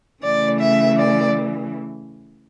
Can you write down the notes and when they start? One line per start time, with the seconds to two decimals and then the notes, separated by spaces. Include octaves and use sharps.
0.23 C#3 E3 A3 D5
0.60 E5
0.98 D5